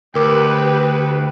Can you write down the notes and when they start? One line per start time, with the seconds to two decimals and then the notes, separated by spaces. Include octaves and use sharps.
0.15 D2 G4 A#4 B4 G5 D6